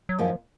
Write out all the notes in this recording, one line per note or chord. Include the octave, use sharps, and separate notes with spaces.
F#3
F#2 D#3 F3 A#3 C#4 F4